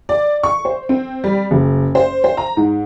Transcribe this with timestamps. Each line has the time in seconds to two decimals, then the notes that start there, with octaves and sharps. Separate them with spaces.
0.09 D5
0.43 C#6
0.65 C5
0.89 C4
1.24 G3
1.51 F#1
1.95 C5
2.24 C5
2.37 A#5
2.57 G#2